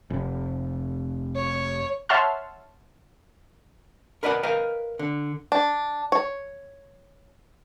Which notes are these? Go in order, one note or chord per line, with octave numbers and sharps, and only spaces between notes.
F1
C#5
C#5 E5 F#5 A5 C6 F6
A#4 B4 D5 D#5 F5 F#5
A#4 B4 D#5 F5 G5
D3
D4
C#5